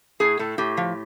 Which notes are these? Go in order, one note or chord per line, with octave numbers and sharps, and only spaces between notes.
A2 G#4
A2 A4
A2 G4
F3